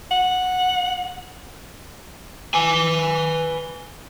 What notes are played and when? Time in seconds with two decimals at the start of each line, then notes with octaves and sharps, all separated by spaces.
0.11 F#5
2.54 B4 G#5